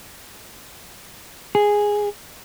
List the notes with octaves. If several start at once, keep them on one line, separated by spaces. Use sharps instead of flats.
G#4